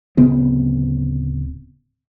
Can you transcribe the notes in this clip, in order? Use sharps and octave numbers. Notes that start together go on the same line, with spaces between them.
D1 C#3 B3 C4